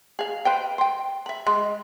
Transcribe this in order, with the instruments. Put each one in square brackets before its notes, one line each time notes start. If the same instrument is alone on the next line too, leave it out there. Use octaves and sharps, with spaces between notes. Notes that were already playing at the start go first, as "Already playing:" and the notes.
[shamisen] G#4 F5
B4 C5 G5
C5 G5
E5 B5
G#3